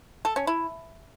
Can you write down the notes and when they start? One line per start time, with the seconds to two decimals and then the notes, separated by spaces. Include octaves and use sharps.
0.25 A4
0.36 C#4
0.47 E4